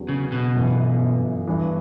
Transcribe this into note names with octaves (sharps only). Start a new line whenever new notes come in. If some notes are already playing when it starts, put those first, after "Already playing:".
Already playing: E2 D3 F#3 C#4
C#3
B2
G1 F#2 E3
G1 G2 E3